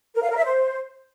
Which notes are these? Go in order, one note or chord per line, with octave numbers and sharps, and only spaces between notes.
A#4
F5
A#4
E5
C5